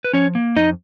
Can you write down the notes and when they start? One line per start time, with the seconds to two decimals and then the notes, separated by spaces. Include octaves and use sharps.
0.04 B4
0.13 F3 C#4 C#5
0.35 A#3
0.56 F2 D#4 D#5